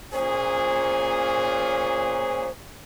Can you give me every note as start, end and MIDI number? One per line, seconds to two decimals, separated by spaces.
0.13 2.47 46
0.13 2.47 61
0.13 2.47 68
0.13 2.51 72